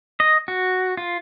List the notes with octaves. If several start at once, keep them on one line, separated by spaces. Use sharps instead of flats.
D#5
F#4
F4